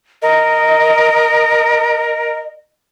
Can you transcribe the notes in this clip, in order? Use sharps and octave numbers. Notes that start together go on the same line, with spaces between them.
A#4 D#5